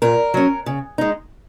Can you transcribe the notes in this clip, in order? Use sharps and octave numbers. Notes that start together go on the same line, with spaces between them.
A#2 A#4
F#3 C#4
C#3
G#3 D#4